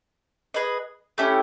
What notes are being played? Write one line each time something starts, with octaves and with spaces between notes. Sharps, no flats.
G#4 B4 D#5
A3 C#4 E4 G4